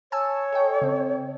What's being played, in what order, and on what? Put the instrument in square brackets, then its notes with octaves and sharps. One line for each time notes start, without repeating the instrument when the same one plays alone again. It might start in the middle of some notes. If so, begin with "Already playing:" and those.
[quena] C#5 [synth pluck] G#5 A5 E6
[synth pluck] A4 D#5 G5
C#3 C4